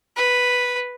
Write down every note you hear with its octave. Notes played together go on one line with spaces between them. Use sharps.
B4